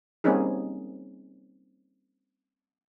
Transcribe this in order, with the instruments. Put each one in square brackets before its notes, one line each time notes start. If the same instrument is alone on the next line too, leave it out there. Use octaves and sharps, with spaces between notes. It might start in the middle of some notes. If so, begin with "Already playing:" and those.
[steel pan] G3 A#3 C4 C#4 D#4 G#4